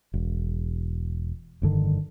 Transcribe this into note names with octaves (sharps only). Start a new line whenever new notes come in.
E1
F1 G2 D3 D#3